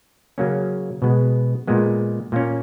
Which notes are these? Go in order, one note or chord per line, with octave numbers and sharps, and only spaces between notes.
C#3 F#3 A#3 C#4
B2 G#3 B3
A#2 G#3 B3
A#2 A#3 C#4